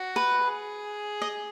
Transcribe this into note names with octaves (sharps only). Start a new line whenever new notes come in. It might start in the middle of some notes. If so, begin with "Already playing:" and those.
Already playing: F#4
B4
G#4
D#5